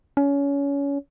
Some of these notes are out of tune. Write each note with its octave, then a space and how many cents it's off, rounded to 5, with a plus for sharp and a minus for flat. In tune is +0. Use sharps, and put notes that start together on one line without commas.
C#4 +25